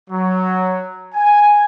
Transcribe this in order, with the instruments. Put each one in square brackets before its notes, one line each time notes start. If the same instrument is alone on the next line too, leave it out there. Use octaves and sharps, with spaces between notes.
[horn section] F#3
G#5